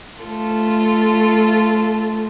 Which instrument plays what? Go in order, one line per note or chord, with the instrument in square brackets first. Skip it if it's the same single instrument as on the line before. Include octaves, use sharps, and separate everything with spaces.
[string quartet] A3 F4 A4